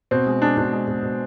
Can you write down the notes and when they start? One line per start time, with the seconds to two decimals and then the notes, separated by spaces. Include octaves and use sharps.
0.11 B2 C4
0.27 G#3
0.42 G#3 D4
0.57 B2 D4
0.73 G#3
0.88 B2
1.03 B2